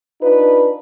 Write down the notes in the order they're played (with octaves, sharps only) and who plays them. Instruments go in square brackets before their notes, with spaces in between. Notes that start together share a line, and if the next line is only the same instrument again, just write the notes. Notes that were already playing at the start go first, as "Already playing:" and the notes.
[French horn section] D4 D#4 F4 B4